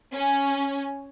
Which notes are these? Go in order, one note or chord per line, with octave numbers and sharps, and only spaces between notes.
C#4